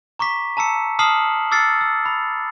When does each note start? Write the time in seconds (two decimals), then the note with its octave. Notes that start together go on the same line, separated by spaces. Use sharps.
0.19 A#5 C#6 D6 B6
0.57 A5 A#5 E6 C#7
0.99 A5 D#6 F6 C7 E7 F#7
1.51 D6 E6 F6 A6 C7 C#7
1.81 E6
2.06 B5